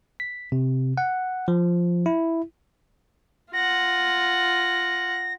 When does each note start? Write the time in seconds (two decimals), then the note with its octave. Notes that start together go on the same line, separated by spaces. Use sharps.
0.20 B6
0.52 C3
0.98 F#5
1.48 F3
2.06 E4
3.53 F4 F#5 A#6